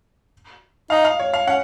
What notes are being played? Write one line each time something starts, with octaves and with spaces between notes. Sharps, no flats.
D#4 F5
F5
C#5
F5
C#4 F#5